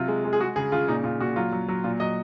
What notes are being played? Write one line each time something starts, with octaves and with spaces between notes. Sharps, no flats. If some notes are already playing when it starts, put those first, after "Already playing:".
Already playing: C3 F#3 F4
G#3
G#3
G#4
G#3 F#4
C#3 G#4
C#3 F4
A#2 D#4
A#2 F4
A#2 F#4
F#3 F4
F#3
F#3
A#2 F4
F#3 D#5